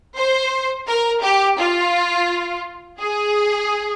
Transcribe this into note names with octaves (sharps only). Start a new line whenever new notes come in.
C5
A#4
G4
F4
G#4